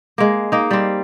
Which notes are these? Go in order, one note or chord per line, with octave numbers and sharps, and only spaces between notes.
G#3 A#3
A#3 D#4
G3 C4